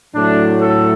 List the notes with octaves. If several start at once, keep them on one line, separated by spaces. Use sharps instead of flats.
A2 F#3 A3 D4
A4